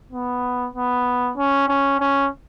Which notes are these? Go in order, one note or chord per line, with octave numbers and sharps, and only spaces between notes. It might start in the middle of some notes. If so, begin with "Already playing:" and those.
B3
B3
C#4
C#4
C#4